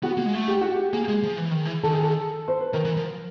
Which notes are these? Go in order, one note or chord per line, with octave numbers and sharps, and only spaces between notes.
B3 F#4
A#3
G#3
A3
G4
F#4
G4
A#3 G#4
G#3
F3
E3
D#3
E3
D#3 A4
G#4
A4
C5
B4
D#3 A#4
E3
F3